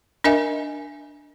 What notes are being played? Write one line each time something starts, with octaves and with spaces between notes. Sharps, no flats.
D4 A#4 D#5 E5 G#5